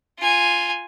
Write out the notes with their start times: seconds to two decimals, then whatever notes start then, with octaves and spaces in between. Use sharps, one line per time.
0.19 F4 G#5